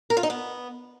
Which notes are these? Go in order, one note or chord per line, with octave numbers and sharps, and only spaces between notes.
A#4
F4
D#4
B3